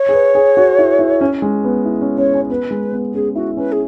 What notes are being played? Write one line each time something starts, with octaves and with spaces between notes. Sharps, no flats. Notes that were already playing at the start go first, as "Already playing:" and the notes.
Already playing: C#5
G#4
B4
G#4
F#4
E4
E4
C#4
G#3
B3
E4
C#4
C#4 C#5
C#4
B3 B4
G#3
B3
C#4 G#4
E4 F#4
C#4 B4
G#4